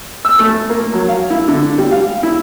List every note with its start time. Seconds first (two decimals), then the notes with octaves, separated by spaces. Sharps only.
0.25 E6
0.39 A3
0.70 A#3
0.94 F#3
1.08 F5
1.30 E4
1.48 D3
1.78 G3
1.91 F5
2.23 E4